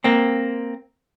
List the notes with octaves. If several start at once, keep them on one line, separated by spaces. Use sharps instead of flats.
A#3 C4